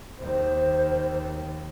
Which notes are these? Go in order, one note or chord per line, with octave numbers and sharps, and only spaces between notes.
D#2 D#3 C5